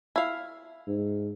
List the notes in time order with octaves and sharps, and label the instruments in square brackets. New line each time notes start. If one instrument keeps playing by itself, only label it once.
[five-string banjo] E4 F5
[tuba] G#2